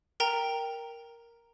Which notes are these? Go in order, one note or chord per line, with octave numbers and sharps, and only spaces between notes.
A#4 G5 A#5